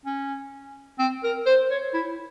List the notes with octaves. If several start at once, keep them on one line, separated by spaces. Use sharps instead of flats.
C#4
C4
A#4
C5
C#5
E4